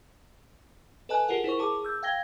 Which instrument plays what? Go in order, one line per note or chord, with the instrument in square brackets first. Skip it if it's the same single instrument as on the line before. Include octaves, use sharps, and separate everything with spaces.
[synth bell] A4 B4 D#5 G#5 A5 F#6
F4 G4 G#4 A#4 F#5
E4 A#4 C5 C#6
G#4 A5 D6
E6 G6
F5 G5 G#6 A#6 G7